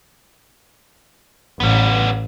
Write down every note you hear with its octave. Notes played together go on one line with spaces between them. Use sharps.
A1 G3 B3